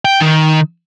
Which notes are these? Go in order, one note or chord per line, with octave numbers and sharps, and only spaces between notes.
G5
D#3